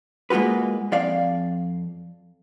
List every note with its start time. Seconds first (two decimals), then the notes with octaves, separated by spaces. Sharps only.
0.30 G#3 A#3 F4 F#4 B4
0.92 F2 D5 F5